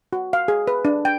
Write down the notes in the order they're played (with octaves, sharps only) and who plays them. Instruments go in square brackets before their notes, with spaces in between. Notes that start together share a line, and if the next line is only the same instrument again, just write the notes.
[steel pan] F#4
F5
G#4
B4
D4
G5